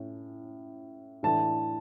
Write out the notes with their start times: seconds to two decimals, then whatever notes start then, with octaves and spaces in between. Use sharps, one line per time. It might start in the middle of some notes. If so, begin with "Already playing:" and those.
Already playing: A2 C#4
1.23 A2 E3 A3 D4 A5